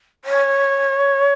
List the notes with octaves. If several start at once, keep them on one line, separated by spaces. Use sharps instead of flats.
C#5